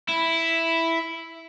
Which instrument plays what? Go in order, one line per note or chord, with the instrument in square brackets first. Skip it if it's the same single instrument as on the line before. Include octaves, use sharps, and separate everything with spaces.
[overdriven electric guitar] E4